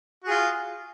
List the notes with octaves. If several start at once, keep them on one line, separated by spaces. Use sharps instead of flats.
F4 F#4 G#4